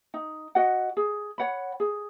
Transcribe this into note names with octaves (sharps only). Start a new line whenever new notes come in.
D#4
F#4 D#5 F#5
G#4
C#5 F#5 B5
G#4